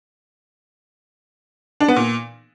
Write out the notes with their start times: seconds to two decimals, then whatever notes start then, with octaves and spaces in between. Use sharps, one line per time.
1.80 D4
1.88 B3
1.96 A#2